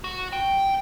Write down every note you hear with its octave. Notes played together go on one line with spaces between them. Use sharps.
F#4
G5